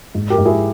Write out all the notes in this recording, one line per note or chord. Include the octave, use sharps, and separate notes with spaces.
G#2
G4 A#4
G#2
E4 G#4